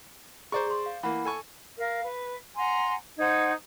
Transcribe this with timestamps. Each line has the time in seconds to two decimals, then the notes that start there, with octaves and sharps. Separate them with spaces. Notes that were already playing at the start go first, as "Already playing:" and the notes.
0.52 G#4 C5 D5 A#5 C#6
0.67 G#4 C6
0.86 F5
1.03 E3 A#3 F#5 B5
1.25 A4 G#5 C#6
1.77 A#4 F5
2.02 B4
2.56 F#5 G#5 A#5 C6
3.18 D#4 C5 F#5 G#6